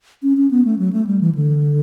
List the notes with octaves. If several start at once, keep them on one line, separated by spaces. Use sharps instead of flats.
C#4
C#4
B3
A3
F#3
A3
G3
E3
D3